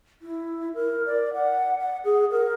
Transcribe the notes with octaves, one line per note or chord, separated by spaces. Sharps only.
E4
A#4
D5
F#5
F#5
G#4
A#4